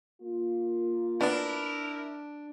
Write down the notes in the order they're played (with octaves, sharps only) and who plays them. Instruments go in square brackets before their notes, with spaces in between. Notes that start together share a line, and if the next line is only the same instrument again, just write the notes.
[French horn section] A#3 F4
[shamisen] B3 D5 [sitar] D4 [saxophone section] E4 A#4